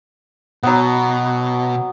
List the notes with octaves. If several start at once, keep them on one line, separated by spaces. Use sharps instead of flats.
B2 F#3 B3